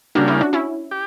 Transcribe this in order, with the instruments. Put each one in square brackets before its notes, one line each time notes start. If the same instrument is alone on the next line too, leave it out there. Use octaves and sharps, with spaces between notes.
[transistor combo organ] C#3 G3 A#3 [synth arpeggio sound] D4 F#4
[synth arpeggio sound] C#4 E4
D4 F#4
C#4 E4
[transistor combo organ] G4